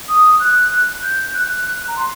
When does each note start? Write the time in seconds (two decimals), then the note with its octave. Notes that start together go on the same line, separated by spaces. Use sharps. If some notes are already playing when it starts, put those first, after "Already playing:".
0.08 D#6
0.39 F#6
1.03 G6
1.34 F#6
1.87 A#5
1.96 C6